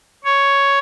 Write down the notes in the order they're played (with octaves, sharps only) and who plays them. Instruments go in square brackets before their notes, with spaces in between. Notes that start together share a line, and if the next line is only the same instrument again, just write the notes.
[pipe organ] C#5